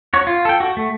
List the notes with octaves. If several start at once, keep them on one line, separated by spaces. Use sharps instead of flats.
F#4 C#5
F4
A4 G5
F#4
A3